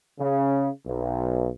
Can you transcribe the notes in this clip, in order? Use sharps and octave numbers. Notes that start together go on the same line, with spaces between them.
C#3
B1